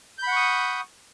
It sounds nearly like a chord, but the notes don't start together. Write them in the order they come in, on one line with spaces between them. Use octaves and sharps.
G6 B5 F#5 C#6 D#6